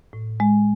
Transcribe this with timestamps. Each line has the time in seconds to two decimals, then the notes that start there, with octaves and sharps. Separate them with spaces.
0.13 A2
0.40 G#3